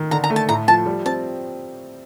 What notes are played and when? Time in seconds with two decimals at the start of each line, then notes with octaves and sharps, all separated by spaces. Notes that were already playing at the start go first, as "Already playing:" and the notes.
Already playing: D#3
0.11 D3 A#5
0.24 A#5
0.30 A3
0.36 A5
0.49 A2 A#5
0.68 F3 A5
0.86 G3
1.06 C4 A5